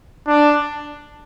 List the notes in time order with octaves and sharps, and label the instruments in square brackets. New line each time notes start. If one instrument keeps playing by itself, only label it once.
[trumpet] D4